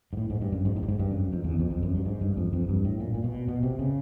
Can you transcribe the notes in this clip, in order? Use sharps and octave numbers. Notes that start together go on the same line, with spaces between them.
G#2
A2
G#2
G2
F#2
G#2
A2
G2
G#2
G2
F#2
F2
E2
F2
F2
F#2
G2
G#2
G2
F2
F2
G2
A2
A#2
A#2
B2
B2
C3
C#3